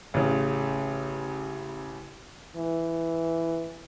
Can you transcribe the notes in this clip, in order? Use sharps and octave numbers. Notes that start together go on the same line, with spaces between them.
A1 C#3
E3